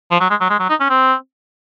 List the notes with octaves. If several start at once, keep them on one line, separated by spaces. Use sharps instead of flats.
F3
F#3
G#3
F#3
G#3
F#3
D#4
C#4
C4